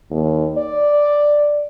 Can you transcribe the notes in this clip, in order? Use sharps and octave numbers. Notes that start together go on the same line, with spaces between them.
D#2
D5